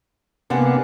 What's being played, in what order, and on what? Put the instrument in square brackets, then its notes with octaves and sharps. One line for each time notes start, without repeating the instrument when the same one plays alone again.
[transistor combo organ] C3 A#3 B3 [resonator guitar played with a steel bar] G#3 D4 F#5